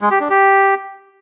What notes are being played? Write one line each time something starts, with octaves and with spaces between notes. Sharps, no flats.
G#3
G4
D4
G4